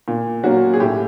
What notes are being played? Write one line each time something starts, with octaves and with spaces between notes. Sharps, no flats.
A#2
F#3 A#3 C#4 F#4
G#4
A2 G4